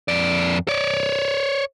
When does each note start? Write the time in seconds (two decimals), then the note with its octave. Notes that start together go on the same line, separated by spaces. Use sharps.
0.08 F2 D5
0.68 C#5 D5